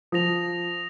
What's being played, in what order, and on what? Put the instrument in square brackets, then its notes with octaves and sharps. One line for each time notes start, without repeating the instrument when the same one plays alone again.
[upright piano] F3 [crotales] D#6 A#6 F7